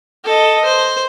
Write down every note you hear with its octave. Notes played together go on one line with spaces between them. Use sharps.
A4 D#5
C5